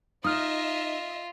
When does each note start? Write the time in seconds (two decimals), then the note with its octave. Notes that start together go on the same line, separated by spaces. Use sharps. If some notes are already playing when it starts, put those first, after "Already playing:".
0.24 D#4 F4 D#5 E5 D#6 F6